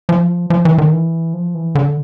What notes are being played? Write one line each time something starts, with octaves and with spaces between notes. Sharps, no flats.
F3
F3
E3
D#3
E3
F3
E3
D3